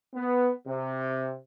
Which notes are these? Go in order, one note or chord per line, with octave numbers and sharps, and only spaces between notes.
B3
C3